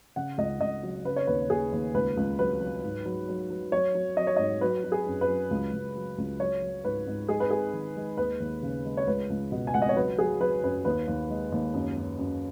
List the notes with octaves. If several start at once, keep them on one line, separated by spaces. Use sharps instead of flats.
C#3 F#5
C#2 D#5
C#2 D#5
F#3
C#3 B4
C#5
D#2 B4
D#2 G#4
D#2
C#2 B4
C#2
F#3 B4
F#3
G#2
F#3
F#3
F#3
F#3 C#5
F#3
F#3 D#5
C#5
G#2 D#5
F#3 B4
F#3
G#4
F#2
B4
F#3
C#2
C#2
F#3
C#2
F#3 C#5
F#3
G#2 B4
G#2
G#3 G#4
B4
G#3 G#4
D#3
G#3
D#2 B4
D#2
C#3
G#3
C#5
C#2 B4
C#2
B2
G#5
C#2 F#5
D#5
C#5
F#3 B4
F#3 G#4
F#3 B4
F#2 B4
D#2 B4
D#2
G#3
D#2
F#2
F#2
F#2